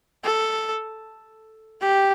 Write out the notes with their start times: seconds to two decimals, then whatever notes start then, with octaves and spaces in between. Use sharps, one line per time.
0.24 A4
1.81 G4